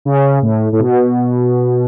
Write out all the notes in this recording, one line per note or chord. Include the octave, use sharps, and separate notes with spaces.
C#3
A2
A2
B2